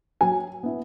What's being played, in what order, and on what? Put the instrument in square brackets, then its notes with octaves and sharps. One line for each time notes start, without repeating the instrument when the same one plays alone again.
[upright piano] F#3 G#5
B3 E4